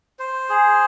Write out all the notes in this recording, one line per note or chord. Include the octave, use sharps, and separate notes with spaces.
C5
G#4